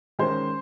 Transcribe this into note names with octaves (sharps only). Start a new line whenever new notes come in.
D#3 G#3 C#4 C5